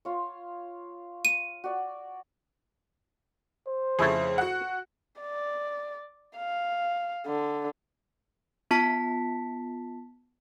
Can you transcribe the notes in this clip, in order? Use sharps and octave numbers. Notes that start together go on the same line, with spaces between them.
F4 C#5
D#7
F#4 D5
C5
F2 C#3 A3 E4 G#4
F#4 F#5
D5
F5
D3
B3 F4 A5 B6